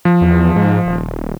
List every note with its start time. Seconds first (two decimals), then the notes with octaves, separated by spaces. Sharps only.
0.05 F3
0.21 E2
0.56 G#2
0.86 D#1